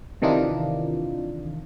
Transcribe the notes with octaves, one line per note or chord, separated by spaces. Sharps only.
C3 D#3 E3 D4 D#4 F4